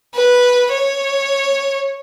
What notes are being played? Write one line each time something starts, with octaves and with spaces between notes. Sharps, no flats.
B4
C#5